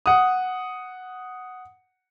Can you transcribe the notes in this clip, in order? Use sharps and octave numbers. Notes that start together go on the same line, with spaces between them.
F#5 D#6